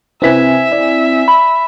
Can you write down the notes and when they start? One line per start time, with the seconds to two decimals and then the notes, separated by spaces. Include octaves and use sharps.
0.22 C3 C4 E4 B4 E5 G#5 B6
0.72 D5
1.28 B5